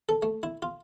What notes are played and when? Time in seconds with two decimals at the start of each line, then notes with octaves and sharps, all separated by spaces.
0.09 A4
0.22 A3
0.43 E4
0.62 F4